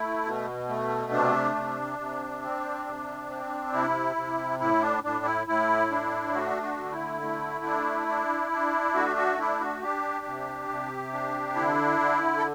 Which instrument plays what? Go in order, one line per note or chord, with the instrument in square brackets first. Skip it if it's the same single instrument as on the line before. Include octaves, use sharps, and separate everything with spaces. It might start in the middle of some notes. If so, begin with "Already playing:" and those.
Already playing: [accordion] A3 E4
B2
A3
C3 D4
C3
C3
C4
C3
C4
C3 E4
C3
A2 E4
D4
A2 D4
E4
A2 E4
D4
A3 F#4
F#4
D3
E4
A3
D4
D4
D4
A3 F#4
F#4
D4 E4
F#4
D4 G4
C3
C3
D4
D3 E4
D3
A4